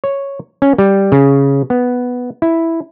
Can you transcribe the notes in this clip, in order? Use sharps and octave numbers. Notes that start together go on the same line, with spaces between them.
C#5
C#4
G3
C#3
B3
E4